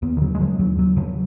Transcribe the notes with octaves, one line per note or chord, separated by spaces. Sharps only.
D#2 B3
D#3
C#3 F#3
G#3
C#3 F#3
D#2 F#3
D#2 F#3
C#3 F#3